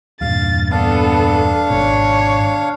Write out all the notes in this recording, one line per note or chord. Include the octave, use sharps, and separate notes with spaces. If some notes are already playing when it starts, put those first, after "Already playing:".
E2 G2 A#2 F5 A6
B3 D4 A4 F5
G#1 G#2 B2 C#5